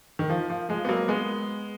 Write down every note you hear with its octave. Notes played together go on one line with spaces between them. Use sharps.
D#3
F3
F3
F3 G#3
B3
F#3 A#3
G#3 B3